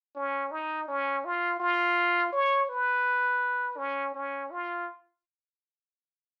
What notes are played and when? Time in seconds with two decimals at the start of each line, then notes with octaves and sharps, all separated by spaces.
0.16 C#4
0.51 D#4
0.88 C#4
1.25 F4
1.60 F4
2.33 C#5
2.69 B4
3.78 C#4
4.14 C#4
4.51 F4